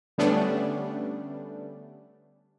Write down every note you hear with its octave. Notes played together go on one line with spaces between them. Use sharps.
D3 G3 A3 B3 C#4 D4